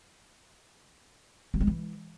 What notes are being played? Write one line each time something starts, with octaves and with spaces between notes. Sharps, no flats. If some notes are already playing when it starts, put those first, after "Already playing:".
F#3
G#3
E3